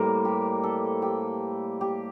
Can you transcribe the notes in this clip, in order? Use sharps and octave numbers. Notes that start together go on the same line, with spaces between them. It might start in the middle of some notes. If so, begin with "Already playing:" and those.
Already playing: A2 G3 A#3 A#4 C5
G4
A4
G4
G4